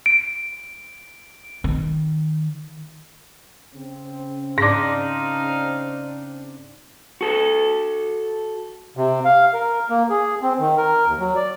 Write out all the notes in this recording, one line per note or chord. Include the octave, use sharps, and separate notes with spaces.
D7
D#3
C#3 C4
G#2 D4 D#4 F5 C6 D6 A#6
F#4 A4
C3
F5
A#4
A#3
G#4
C4
D#3
A#4
D#2
F#3
D5